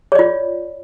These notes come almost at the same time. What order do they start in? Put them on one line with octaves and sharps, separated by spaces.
C#5 D5 F4